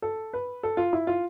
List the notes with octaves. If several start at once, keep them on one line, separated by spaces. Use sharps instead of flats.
A4
B4
A4
F4
E4
F4